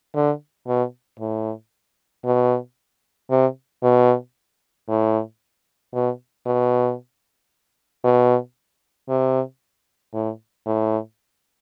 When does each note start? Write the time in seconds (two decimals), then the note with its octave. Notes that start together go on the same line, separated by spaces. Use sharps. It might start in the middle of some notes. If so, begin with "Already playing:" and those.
0.15 D3
0.67 B2
1.20 A2
2.25 B2
3.30 C3
3.83 B2
4.88 A2
5.94 B2
6.46 B2
8.04 B2
9.09 C3
10.14 A2
10.66 A2